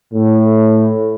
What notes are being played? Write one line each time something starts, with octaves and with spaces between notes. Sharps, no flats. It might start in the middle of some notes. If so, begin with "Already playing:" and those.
A2